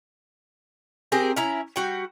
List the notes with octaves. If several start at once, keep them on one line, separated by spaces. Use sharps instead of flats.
C4 G4 G#4 A#4
C#4 E4 A#5
G3 F#4 G5